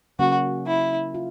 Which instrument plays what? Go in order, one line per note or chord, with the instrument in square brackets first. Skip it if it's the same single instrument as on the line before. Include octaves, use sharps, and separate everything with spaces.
[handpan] C#3 F#3 A#3 C#4 [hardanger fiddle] F#4
[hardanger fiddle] E4
[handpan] F4